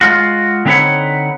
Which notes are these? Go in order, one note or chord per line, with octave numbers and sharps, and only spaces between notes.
G#3 F4 F#4
D3 C4 D#4 B4 C#5 F#5